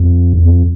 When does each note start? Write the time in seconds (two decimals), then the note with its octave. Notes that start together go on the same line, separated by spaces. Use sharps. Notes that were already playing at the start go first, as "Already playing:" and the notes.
Already playing: F2
0.33 E2
0.46 F2